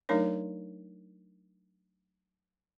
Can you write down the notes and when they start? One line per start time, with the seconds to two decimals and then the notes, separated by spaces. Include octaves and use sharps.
0.09 F#3 A3 D4 D#4 A#4 C#5